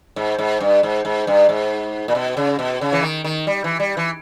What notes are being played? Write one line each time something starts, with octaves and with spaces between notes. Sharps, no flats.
G#2
G#2
G2
G#2
G#2
G2
G#2
A#2
B2
C#3
B2
C#3
E3
D#3
D#3
G3
E3
G3
E3